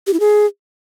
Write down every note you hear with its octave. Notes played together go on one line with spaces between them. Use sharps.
G4
E4
G#4